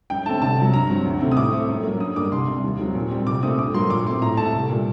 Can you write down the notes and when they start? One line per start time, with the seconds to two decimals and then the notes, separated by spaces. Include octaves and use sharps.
0.10 F#2 G5
0.26 D3 A3 C4 A5
0.42 C2 A5
0.58 C3 F#3
0.73 G2 A#5
0.90 F#3 C4
1.05 D2
1.20 C3 D#3 A3 C4
1.31 D#6
1.37 A2 D6
1.53 A3 C4
1.68 F#2
1.84 F#3 A#3
2.00 G2 D#6
2.16 D3 G3 A#3 D6
2.32 C2 C6
2.48 C3 G3
2.64 D#2
2.79 D#3 F#3 C4
2.95 A#2
3.11 G3 C4
3.27 C2 D6
3.43 A#2 A3 C4 D#6
3.59 G2 D6
3.74 F#3 A#3 C6
3.90 A#2 D6
4.06 A3 C4 C6
4.22 A2 A#5
4.37 A3 C4 A5
4.54 C2
4.70 A#2 G3